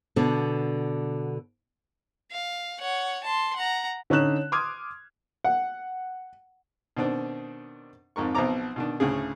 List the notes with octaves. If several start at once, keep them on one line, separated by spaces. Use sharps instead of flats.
B2 D3 D4
F5
C#5 F#5
A5 C6
F#5 A#5
D3 C#4 D#4 F#6 E7
C6 D6 D#6 F6 G#6
F#5
B2 D#3 C4 D4
F2 G#2 A#4 C#6
B1 B2 F3 C4 A#5 D6
B2 D#3 D4
D2 A2 C#3 G#4